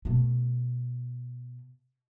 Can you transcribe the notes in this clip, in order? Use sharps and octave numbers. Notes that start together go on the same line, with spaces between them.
B2 A3